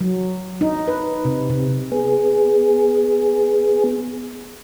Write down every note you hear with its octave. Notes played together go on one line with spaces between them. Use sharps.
F#3
D#4
B4
C3
C3
B3 G#4